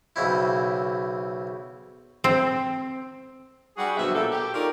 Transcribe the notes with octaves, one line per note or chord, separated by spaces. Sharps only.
B1 C#3 C4 E4
C4
G3 F#4 G#4
D2 B2 F3 F#3 E5
A#2 A#3 G4 A4
G4
D#4 F4 A4 A#4 C#5 D5